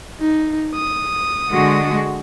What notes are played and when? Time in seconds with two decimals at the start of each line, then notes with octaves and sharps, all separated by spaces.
0.20 D#4
0.75 D#6
1.50 D3 G#3 F#4